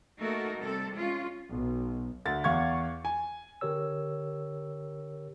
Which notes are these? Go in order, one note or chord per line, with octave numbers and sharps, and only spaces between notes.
A3 A#3 D#4 F#4 A4 A#4
C3 G3 C4 A4
G#3 C#4 F4
B1
D2 A6
E2 F5 C#6 G#6
G#5
D3 G4 A#4 C#5 E6